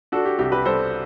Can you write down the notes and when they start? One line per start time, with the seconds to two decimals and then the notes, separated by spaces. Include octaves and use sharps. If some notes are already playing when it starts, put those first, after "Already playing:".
0.12 D4 F#4 A4
0.25 G4
0.39 C2 G4
0.52 G4 B4
0.65 G3 A4 C5